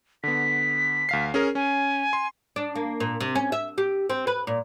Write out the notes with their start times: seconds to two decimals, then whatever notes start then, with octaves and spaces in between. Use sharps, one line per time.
0.23 D3 B3 B6
1.09 D2 F5 C7
1.34 C#4 G#4 A#4
1.55 C#4 G#5
2.13 C6
2.56 D4
2.75 A#3
3.00 A#2
3.20 C3
3.35 C#4
3.52 E5
3.78 G4
4.10 C4
4.27 B4
4.47 A#2